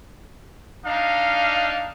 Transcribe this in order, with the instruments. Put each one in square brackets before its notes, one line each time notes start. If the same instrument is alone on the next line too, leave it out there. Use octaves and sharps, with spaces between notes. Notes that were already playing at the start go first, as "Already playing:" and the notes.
[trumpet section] D4 D#4 [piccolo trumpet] F5